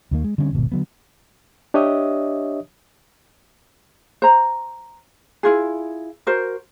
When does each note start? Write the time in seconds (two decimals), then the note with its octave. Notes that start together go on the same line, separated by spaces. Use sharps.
0.11 D#2 D#3 A#3
0.24 G#3
0.38 D3 G3 C4 C#4
0.51 D#1 G#1 B2
0.72 D3 F#3 B3
1.74 D4 G4 C#5 D#5 E5 D#6
4.22 C5 A#5
5.43 E4 F4 G#4
6.27 F#4 A#4 C5